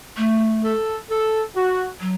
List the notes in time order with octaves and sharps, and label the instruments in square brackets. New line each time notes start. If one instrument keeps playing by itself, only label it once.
[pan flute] A3
[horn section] A4
A4
F#4
[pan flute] F#3